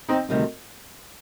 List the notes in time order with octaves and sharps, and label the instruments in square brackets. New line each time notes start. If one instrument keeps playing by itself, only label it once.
[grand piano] C4 D#4
[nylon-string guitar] D2 C3 D#3 G3 C4